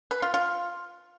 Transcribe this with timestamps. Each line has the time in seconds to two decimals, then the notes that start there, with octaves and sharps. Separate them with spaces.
0.11 B4
0.22 F4
0.34 F4